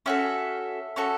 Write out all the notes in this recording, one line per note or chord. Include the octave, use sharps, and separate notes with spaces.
C#4 F#4 A4 E5
C#4 F#4 A4